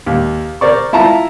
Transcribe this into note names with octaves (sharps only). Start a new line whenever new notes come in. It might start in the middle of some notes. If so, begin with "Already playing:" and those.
D#2
A#4 C5 D5 C#6
E4 F4 A5 A#5